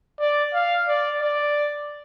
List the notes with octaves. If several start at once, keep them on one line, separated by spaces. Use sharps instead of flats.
D5
F5
D5
D5